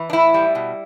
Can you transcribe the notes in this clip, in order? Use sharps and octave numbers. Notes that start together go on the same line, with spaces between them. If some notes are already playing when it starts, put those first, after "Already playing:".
Already playing: E3
D4
A2 E4
G3
B2